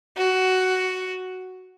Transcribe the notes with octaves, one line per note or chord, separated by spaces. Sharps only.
F#4